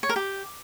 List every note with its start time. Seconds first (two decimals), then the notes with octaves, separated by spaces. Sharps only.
0.03 C#5
0.09 A#4
0.16 G4